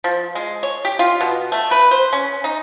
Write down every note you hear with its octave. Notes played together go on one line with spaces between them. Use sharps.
F3
G#3
C#5
G4
F4
B2
A3
B4
C5
C#4
D#4